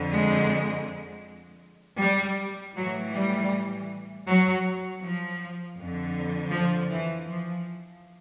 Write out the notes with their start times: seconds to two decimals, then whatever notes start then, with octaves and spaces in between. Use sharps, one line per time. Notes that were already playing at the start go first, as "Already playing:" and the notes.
Already playing: F2 D3
0.12 G#3
2.00 G3
2.75 A2 E3 F#3
3.13 G3
4.26 F#3
5.01 F3
5.77 F2 D3
6.51 F3
6.89 E3
7.27 F3